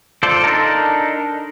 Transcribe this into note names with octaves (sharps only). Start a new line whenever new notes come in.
F4 A4 C5 D5
D4 D#4 A4 A#4